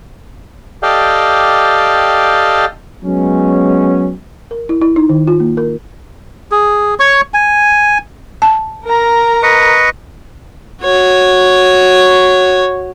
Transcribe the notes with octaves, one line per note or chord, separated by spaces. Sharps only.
G4 A4 D5 D#5 F5 G5
F#3 G#3 B3 C#4
A#4
E4
E4
D#4
D#3
F4
A#3
A#4
G#4
C#5 C#6
G#5
A5
A#4 A#5
B4 D#5 C#6
F#4 C#5